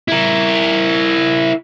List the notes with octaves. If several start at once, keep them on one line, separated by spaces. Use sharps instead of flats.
E4 A#4